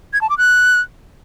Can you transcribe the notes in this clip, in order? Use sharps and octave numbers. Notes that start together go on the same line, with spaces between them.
G#6
A5
D6
F#6